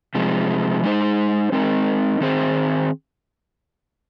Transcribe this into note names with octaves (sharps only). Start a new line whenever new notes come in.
C3 F3 G#3
G#3 D#4 C5
G#3 C4 D#4 A#4
D#3 C4 G#4 C5